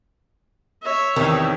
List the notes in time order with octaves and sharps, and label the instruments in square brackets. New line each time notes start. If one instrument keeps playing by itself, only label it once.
[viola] C#5 E5
[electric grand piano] E2 C3 [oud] D#3